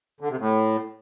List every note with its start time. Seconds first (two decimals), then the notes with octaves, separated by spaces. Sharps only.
0.21 D3
0.30 C3
0.39 A2